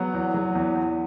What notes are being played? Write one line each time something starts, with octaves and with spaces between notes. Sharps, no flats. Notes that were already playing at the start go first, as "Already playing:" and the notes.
Already playing: F#3 B3
E2
F#3
E2
E2